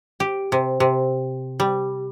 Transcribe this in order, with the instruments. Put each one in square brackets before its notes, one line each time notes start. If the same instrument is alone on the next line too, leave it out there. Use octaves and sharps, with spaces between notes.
[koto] G4
C3
C3
G3